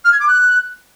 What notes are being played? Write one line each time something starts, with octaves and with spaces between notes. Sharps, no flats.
F6
G#6
D6
F#6